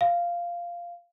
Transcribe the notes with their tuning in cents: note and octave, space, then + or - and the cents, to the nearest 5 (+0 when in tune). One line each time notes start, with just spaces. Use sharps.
F5 -10